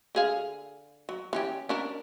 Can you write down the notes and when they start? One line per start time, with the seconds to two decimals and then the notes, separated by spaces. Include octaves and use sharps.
0.15 D3 G#4 F5
1.09 F#3
1.33 E3 C#4 G4
1.69 C#4 D4 A#4